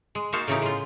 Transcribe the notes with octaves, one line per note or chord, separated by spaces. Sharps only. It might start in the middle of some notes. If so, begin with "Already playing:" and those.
G#3
A#3 D#4 F#4 C5 F5 A5
A2 C#3 E3 C#4 D#4 G4
G#3 F4